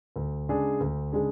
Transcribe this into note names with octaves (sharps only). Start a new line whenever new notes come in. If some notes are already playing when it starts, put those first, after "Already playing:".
D2
C#3 G#3 D4 G#4
D2
C#3 G#3 D4 G#4